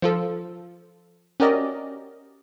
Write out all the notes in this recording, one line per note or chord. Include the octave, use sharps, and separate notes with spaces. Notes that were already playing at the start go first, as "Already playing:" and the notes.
F3 F4 A4
C#4 F#4 G4 A#4 D5 D#5